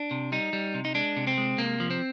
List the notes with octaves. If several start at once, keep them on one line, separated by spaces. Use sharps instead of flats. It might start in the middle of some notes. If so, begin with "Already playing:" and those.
Already playing: D4
C3
G3 D#4
G3
C3
D#4
G#3 D4
C3
C4
G#3
C3 A#3
F3
C4